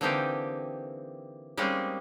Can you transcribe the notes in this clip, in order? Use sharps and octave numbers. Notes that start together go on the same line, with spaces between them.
D3 E3 A#3 C4 D#4 G4
G3 G#3 A#3 C4 C#4 D#4